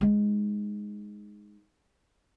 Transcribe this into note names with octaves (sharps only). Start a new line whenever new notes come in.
G#3 D#4